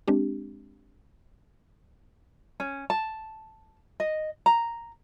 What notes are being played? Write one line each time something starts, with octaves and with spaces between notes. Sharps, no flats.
G#3 C4 D4 G4
C#4
A5
D#5
A#5